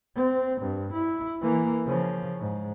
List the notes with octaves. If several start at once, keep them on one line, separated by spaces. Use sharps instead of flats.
C4
G2
E4
E3 A#3
C#3 F3
G#2